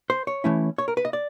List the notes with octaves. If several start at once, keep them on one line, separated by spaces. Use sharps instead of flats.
C5
C#5
E3 A3 C#4 E4
C#5
A#4
B4
D#5
D5